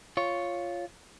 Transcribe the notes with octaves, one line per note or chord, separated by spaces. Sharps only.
F4 C#5